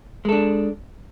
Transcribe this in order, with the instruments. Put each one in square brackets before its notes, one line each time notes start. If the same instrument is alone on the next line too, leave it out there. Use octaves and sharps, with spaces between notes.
[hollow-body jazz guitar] G#3
A4
D4